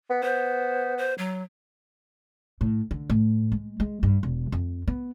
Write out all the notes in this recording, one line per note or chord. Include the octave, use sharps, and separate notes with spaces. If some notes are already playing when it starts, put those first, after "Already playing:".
B3
B3 C5
C5
F#3
A2
D3
A2
G#3
G#3
G2
E1
F2
B3